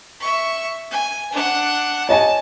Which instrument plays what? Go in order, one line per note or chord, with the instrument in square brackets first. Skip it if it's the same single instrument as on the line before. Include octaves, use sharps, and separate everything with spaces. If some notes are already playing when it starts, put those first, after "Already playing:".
[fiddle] E5 C#6
G#5
D4 F#5
[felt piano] C#5 D#5 G#5 [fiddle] A5